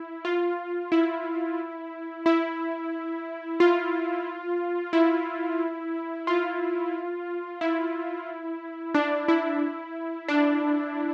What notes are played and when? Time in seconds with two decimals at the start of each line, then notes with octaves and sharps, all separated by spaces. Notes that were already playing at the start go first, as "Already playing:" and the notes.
Already playing: E4
0.25 F4
0.92 E4
2.26 E4
3.60 F4
4.93 E4
6.27 F4
7.61 E4
8.95 D4
9.28 E4
10.28 D4